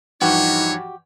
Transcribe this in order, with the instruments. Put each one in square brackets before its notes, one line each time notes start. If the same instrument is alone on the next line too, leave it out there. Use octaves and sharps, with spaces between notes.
[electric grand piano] G2 E3 F3 [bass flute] D#4 [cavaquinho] F#4 G4 [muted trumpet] C#5